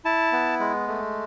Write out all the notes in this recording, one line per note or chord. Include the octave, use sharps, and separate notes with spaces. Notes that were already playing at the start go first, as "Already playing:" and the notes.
E4 A5
B3
G#3
A3